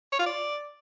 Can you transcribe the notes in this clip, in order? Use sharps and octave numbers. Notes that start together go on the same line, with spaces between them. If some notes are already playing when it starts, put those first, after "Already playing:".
C#5
F4
D5